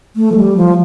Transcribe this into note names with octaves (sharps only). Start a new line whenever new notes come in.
A3
F3
G3
F3